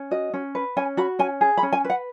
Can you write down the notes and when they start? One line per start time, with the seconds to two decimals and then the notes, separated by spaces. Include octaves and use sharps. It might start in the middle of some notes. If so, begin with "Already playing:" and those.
Already playing: C#4
0.11 F#4 D#5
0.34 C#4
0.55 B4
0.77 C#4 G#5
0.97 F#4 B5
1.19 C#4 G#5
1.41 G#4
1.57 B5
1.63 C#4
1.73 G#5
1.84 B4
1.90 F#5